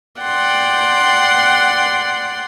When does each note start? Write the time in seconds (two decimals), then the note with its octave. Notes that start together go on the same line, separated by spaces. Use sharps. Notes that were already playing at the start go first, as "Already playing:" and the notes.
0.20 D5 F#5 G5 C6